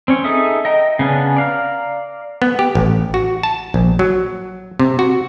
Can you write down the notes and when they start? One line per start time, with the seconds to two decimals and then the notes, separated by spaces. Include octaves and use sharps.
0.08 C4 C#4 C#5
0.24 D#4 G#4 A4 E5 D#6
0.65 D#5 G5 A#5
0.99 C#3 B3 C#4 D4
1.37 D5 F5 A#5
2.42 B3
2.59 G4
2.75 A1
3.14 F#4
3.43 A5
3.74 A#1
3.99 F#3
4.80 C3
4.99 F#4